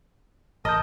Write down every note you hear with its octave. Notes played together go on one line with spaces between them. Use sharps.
A1 A#4 D#5 A5 G6